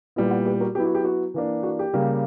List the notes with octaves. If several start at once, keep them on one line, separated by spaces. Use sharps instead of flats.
A#2 G3 B3 E4
D5 F#5
G4 B4
F#4 A#4
F#3 B3 E4 G4
F#4
G4
F#4
E3 A#3 D4
F#4
G4
C#3 G3 A#3